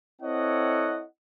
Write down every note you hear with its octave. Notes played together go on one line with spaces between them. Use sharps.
C4 E4 A4 C#5 D#5 F#5